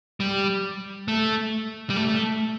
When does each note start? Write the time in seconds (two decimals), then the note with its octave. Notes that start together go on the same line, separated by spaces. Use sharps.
0.20 G3
1.08 A3
1.90 G3
1.96 A3